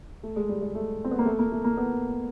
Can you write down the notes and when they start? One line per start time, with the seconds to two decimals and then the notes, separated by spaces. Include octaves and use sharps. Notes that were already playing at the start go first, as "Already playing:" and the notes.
0.23 A3
0.36 G#3
0.49 G3
0.62 G#3
0.75 A3
1.04 C4
1.11 B3
1.19 A#3
1.26 A3
1.39 A#3
1.52 A3
1.64 A#3
1.77 B3